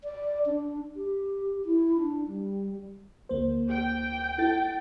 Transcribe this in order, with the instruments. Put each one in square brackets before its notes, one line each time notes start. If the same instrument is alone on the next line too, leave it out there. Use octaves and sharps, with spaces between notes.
[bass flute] D5
D4
G4
E4
D4
G3
[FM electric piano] D2 A#3 C5
[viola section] G5
[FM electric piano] E4 A4 A6